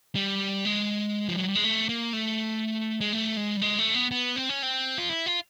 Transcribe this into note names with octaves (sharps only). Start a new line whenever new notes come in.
G3
G#3
F3
F#3
G3
G#3
A3
A#3
A3
G#3
A3
G#3
G3
G#3
A3
B3
B3
C4
C#4
C4
F4
E4
F4